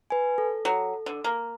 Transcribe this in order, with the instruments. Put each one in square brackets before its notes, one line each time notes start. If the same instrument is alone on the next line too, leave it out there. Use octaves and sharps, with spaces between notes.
[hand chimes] B4 G#5
A4
[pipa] F#3
D3
A#3